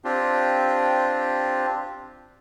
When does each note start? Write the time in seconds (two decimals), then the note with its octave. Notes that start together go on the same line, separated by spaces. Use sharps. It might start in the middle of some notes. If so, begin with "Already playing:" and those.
0.05 C4 D4 F4 G4